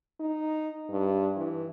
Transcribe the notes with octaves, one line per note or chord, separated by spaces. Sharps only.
D#4
G2
E3